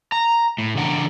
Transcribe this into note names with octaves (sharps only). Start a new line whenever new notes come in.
A#5
A2
C#3 E3 D4 F#5 G5 A#5